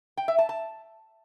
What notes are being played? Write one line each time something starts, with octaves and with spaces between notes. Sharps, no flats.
G5
E5
A5
A5